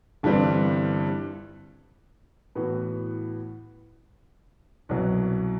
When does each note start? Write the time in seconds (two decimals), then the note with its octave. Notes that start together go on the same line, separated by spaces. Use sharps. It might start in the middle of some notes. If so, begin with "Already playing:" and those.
0.23 G1 G2 E3 G3 C4
2.55 A2 E3 B3 F#4
4.89 C2 B2 F#3